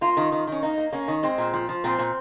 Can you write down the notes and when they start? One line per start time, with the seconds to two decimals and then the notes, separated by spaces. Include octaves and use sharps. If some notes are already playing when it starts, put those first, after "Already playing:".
0.01 A#3 F4
0.17 D#3
0.32 D#3
0.47 D#3 C#4
0.63 A#3 D#4
0.78 A#3
0.92 A#3 C#4
1.08 D#3
1.23 G#3 C4
1.38 A#2
1.53 F3
1.69 F3
1.84 A#2 C4
1.99 A#2